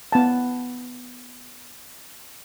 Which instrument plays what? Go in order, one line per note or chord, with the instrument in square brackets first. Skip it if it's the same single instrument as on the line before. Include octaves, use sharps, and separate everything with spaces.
[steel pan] B3 F5 A5